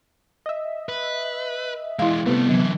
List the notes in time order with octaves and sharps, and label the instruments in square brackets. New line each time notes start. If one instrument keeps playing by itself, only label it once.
[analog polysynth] D#5 E5
[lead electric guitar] B4
[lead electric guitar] E3 G#3 [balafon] E4 F5
[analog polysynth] C3 B3 [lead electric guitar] G3 A3
[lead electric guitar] D3 E3 [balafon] F#3